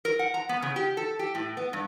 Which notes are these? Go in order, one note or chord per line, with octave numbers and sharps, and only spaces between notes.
A#4
F#5
A#5
B3
C#3
G4
A4
G4
A2
B3
G2